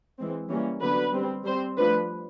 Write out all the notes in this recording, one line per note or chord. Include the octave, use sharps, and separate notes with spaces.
E3 G#3 C4
E3 G3 A#3 C#4
D3 F#3 B3 D4 B4
G3 C4
G3 C4 C5
F3 A3 D4 B4